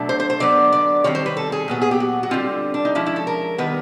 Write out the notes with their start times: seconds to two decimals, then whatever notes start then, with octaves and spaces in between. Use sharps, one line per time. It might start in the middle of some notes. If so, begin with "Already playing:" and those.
Already playing: B2 F#3 A3 D4
0.09 C5
0.20 C5
0.30 C5
0.40 D3 F#3 B3 D5
0.73 D5
1.04 D#3 G3 C4 C#5
1.15 C5
1.26 B4
1.37 A4
1.52 G#4
1.68 A#2 F#3 B3
1.82 G#4
1.91 G4
2.00 F#4
2.23 F#4
2.31 D3 G3 C4 F4
2.74 D4
2.85 D#4
2.95 F3 G#3 C#4 E4
3.06 E4
3.16 A4
3.27 A#4
3.58 D#3 G3 B3 B4